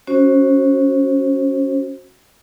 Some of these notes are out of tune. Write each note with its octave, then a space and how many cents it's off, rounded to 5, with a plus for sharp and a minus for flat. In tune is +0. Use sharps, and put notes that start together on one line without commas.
C#4 +0 F#4 +0 C5 +25